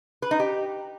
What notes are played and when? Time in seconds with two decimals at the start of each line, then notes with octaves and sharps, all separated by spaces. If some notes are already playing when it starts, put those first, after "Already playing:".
0.22 B4
0.31 D#4
0.40 G4